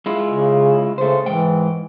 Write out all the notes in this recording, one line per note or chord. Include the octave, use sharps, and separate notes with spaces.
G#3 E4 F4
C#3
C#3 A3 C5
G#2 E3 G5